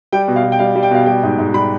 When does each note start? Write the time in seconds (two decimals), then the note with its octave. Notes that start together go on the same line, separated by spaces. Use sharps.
0.12 G3 G5
0.28 B2
0.36 F5
0.44 B2
0.52 G5
0.59 G3 F5
0.76 G3
0.83 G5
0.91 B2 F5
1.06 G3 G5
1.23 G#2
1.38 G#2
1.54 G3 B5